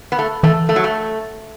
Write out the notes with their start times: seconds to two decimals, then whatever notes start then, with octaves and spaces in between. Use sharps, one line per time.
0.12 B3
0.19 A3
0.43 E3 A3
0.69 A3
0.76 F#3
0.84 A3